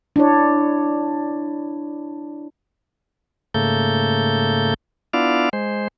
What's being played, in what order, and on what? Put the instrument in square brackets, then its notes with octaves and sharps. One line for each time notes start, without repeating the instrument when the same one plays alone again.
[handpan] D4 E4 C#5
[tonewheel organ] G#2 C#3 A3 A#3 A4 G6
B3 D4 E4 F4 D5 F5
G#3 C5